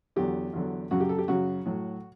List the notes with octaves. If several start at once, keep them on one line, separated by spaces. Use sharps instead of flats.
E2 D3 F#3 G4
E2 D3 F#3
F#2 C#3 F#3 F#4
G4
A4
G4
F#2 C#3 F#3 F#4
A2 F#3